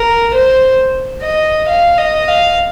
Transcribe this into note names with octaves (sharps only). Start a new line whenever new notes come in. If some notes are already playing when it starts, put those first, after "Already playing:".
Already playing: A#4
C5
D#5
F5
D#5
F5